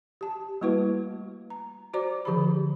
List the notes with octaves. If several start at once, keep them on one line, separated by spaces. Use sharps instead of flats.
G4 A5
G3 A3 A#3 E4 F#4 B4
A#5
F#4 C5 D5 A#5 D6
D3 F3 G4 G#4 C5 B5